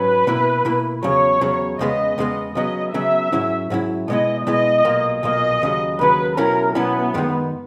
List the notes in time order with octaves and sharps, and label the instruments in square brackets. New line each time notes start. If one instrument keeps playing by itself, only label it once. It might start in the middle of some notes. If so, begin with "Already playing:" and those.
Already playing: [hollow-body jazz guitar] G#2 F#3 C#4 [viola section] B4
[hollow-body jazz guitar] B2 A#3 E4
B2 A#3 E4
[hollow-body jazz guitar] E2 C#3 F#3 [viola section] C#5
[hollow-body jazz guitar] E2 C#3 F#3
[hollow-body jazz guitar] E2 C#3 G#3 B3 [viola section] D#5
[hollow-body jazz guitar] E2 C#3 G#3 B3
[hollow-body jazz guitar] C#3 F#3 B3 [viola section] D#5
[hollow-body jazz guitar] C#3 F#3 B3 [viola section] E5
[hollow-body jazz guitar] G#2 F#3 C#4 E4
G#2 F#3 C#4 E4
[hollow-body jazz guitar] B2 G#3 B3 E4 [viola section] D#5
[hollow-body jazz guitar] B2 G#3 B3 E4 [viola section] D#5
[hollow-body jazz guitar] B1 A#2 A#3
[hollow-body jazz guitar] B1 A#2 A#3 [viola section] D#5
[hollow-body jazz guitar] D#2 C#3 F#3
[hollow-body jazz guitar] D#2 C#3 F#3 [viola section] B4
[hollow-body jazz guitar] B2 F#3 C#4 E4 [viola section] A#4
[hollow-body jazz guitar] B2 F#3 C#4 E4 [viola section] B3
[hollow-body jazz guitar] F#2 D#3 G#3 D#4